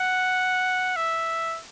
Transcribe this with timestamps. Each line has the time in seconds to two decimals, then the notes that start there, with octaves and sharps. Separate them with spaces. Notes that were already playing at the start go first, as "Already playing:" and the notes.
Already playing: F#5
0.96 E5